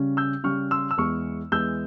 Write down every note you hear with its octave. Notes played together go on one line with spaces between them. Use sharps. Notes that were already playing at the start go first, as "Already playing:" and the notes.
Already playing: C#3 G3 C#4
E6 G6
C#3 G3 C#4 C#6 F6
C6 E6
E6
E2 E3 G#3 C#6 F6
E2 E3 G#3 E6 G6